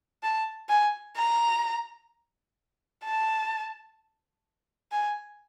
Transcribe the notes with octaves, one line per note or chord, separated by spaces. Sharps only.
A5
G#5
A#5
A5
G#5